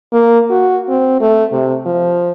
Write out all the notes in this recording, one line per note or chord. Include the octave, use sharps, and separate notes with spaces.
A#3
F#4
C4
A3
C3
F3